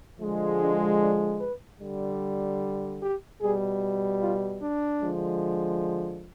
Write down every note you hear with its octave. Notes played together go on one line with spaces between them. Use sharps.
D3 F3 G#3
D4
D4
B4
D3 G3
G4
B2 G3 G#4
F4
D4
D3 F3 G#3